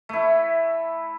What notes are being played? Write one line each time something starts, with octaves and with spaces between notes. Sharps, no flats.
A3 E4